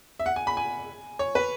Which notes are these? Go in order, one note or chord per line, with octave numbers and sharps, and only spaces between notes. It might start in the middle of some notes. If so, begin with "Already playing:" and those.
E5
F#5
G#5
B5
G#5
C#5
B4